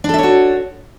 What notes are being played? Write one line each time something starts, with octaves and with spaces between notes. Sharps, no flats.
D4 F#4 A4 C#5 E5